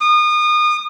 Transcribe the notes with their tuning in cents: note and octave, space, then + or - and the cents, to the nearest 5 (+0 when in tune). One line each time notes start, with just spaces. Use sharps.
D#6 -30